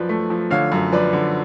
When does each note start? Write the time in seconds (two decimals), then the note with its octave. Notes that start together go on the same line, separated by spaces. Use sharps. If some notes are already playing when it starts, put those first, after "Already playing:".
Already playing: F#2 F3 B4 D5
0.09 A3
0.30 F3
0.50 D3 C#5 F5
0.72 F#2
0.92 F3 B4 D5
1.13 D3